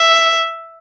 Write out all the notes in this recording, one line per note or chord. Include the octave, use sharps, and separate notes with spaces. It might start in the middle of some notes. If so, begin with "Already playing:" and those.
Already playing: E5